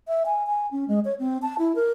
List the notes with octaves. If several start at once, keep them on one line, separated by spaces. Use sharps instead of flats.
E5
G#5
G#5
C#4
G#3
C#5
C4
A5
E4
A#4